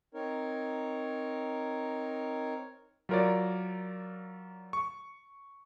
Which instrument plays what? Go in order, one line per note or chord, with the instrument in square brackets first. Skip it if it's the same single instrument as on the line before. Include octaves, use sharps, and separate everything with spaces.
[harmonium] C4 D#4 A#4 C#5
[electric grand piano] F#3 F4 A#4 C#5 D5
C#6